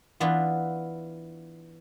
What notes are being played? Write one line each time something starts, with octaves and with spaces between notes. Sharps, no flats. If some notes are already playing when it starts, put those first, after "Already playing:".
E3 B3 D4 E4 F4